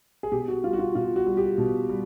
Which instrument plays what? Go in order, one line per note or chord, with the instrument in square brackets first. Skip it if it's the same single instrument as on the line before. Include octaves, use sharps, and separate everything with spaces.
[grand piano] G#4
B2 G4
F#4
G3 F4
F#4
F4
B2 F4
F#4
G3
G4
B2
G3